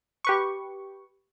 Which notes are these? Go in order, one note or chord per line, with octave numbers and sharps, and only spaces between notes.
G4 B4 C#6